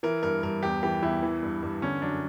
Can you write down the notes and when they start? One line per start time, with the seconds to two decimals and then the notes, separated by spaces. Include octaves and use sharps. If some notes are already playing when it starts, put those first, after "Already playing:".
0.03 E3 A#4
0.23 G2 A#4
0.43 G2 A#4
0.63 E2 G4
0.83 E3 G4
1.03 E2 E4
1.23 E3
1.42 G2
1.63 G2
1.82 D3 C#4
2.02 F#2 D4